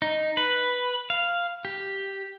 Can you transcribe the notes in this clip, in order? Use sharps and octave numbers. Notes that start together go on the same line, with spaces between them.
D#4
B4
F5
G4